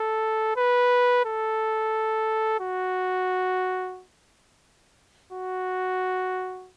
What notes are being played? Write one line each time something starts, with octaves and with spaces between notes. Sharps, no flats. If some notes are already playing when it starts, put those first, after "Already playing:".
Already playing: A4
B4
A4
F#4
F#4